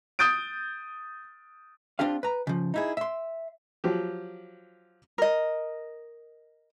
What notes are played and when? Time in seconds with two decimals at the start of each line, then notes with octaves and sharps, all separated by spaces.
0.19 D#6 G6 A6 D7
1.99 C4 D4 F4 G4 F5
2.23 B4 A#5
2.47 C#3 F3
2.74 D#4 E4 G#4
2.97 E5 C6
3.84 F3 F#3 G4
5.18 A#4 D#5